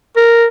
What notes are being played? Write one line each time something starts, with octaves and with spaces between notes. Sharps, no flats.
A#4